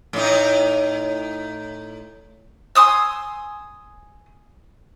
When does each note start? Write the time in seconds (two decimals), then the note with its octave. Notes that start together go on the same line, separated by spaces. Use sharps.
0.13 A2 D#4
2.75 G#5 C6 D#6 E6